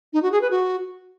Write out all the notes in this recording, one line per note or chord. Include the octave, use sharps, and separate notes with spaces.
D#4
F#4
G#4
B4
F#4